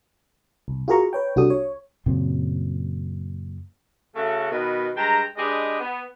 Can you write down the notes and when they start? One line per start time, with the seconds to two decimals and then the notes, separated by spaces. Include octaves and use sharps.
0.68 C2
0.88 F4 F#4 G#4 A#4 A#5 C#6
1.13 B4 C#5 G5
1.36 C2 D4 F#4 G4 A4 D#6
1.50 C#5
2.06 F#2 A#2 C#3 C4
4.16 C#3 A3 F#4
4.51 B2 D#3 B4
4.95 G2 G#3 G5 A5 A#5
5.37 G#3 D4 G4 G#4 B4 D#5
5.80 B3